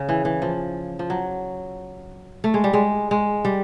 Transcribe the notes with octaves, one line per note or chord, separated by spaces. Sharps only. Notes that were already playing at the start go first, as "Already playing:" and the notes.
Already playing: C#3
E3
E3
F3
F3
F#3
A3
G#3
G3
G#3
G#3
G3